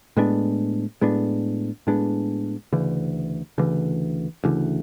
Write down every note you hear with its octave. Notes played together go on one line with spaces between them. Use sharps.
A2 G#3 B3 D4
A2 G#3 B3 D4
A2 G#3 B3 D4
D2 C#3 E3
D2 C#3 E3
D2 C#3 E3